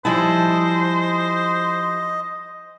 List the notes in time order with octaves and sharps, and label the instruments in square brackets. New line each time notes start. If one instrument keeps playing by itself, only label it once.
[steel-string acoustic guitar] F3 G3 E4 [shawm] C5 [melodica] D#5 [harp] G#5 A5